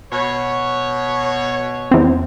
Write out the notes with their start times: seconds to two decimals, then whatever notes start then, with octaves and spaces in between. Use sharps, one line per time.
0.12 B2 C#5
1.91 E2 C4